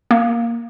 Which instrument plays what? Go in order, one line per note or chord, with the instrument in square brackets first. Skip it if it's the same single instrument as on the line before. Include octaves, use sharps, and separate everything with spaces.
[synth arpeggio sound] A#3